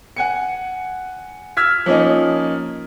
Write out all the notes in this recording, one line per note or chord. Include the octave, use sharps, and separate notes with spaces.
F#5 G#5 C#7
E6 F6 G#6 B6
F3 A#3 C#4 D#4